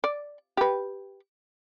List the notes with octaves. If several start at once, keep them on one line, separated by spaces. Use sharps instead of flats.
D5
G4 B4